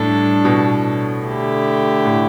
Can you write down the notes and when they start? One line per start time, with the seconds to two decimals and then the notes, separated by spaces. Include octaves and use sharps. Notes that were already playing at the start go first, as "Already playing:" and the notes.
Already playing: A2 G3 D4 A4
0.45 B2
1.24 D3 A3 E4 G4
2.05 A2